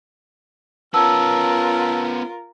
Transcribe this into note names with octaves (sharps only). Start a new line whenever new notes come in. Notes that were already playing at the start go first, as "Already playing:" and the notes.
B3 C#4 F4 A#4 A5 E6